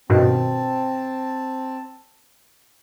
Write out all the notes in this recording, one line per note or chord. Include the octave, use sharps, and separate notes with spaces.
G2 B2 D#3 C4 A5